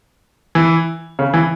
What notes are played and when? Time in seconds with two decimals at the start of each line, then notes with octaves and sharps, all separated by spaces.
0.55 E3
1.19 C#3
1.34 E3